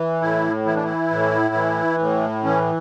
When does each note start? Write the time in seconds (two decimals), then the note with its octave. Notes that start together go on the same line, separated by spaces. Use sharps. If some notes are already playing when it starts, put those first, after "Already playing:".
Already playing: E3
0.21 A2 E4
0.66 E3 E4
0.75 D4
0.83 E4
1.10 A2
1.55 E3
2.00 A2
2.44 E3 C#4